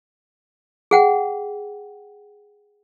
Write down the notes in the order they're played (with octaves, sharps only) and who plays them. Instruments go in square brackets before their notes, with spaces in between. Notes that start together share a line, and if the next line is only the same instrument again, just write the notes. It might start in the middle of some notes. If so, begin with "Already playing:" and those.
[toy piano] G#4 F#5 G5